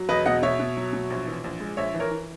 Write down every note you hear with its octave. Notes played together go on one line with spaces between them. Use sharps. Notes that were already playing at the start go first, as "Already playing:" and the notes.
Already playing: F#3
E1 B4 D#5
B2 D#5 F#5
B2 C#5 E5
B2
F#3
B2
A#1
E3
A#1
G#3
A#1 C#5 E5
E3
A#4 C#5
E3